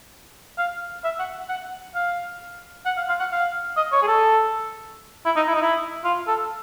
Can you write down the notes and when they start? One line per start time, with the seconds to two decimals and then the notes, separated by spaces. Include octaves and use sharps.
0.58 F5
1.04 E5
1.19 F#5
1.49 F#5
1.95 F5
2.86 F#5
2.97 F5
3.09 F5
3.20 F#5
3.32 F5
3.77 D#5
3.92 C#5
4.02 G#4
4.07 A4
5.25 E4
5.36 D#4
5.48 E4
5.55 D#4
5.62 E4
6.05 F4
6.28 A4